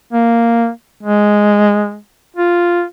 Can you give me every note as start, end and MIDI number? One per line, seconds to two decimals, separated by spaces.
0.13 0.69 58
1.03 1.98 56
2.37 2.84 65